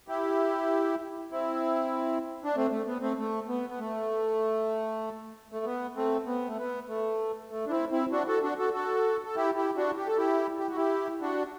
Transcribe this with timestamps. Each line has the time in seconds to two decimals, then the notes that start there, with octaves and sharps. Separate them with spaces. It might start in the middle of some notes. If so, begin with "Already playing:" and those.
0.08 E4 G4
1.32 C4 E4
2.44 D4
2.56 A3 C4
2.71 A3
2.87 B3
3.02 A3 C4
3.18 A3
3.48 B3
3.70 B3
3.80 A3
5.52 A3
5.65 B3
5.96 A3 C4
6.27 B3
6.48 A3
6.58 B3
6.88 A3
7.51 A3
7.67 D4
7.71 C4 E4
7.91 C4 E4
8.12 D4 F#4
8.27 F#4 A4
8.43 D4 F#4
8.58 F#4 A4
8.74 F#4 A4
9.25 A4
9.36 E4 G4
9.56 E4 G4
9.77 D4 F#4
9.97 G4
10.07 A4
10.18 E4 G4
10.59 G4
10.68 F#4
10.76 E4 G4
11.21 D4 F#4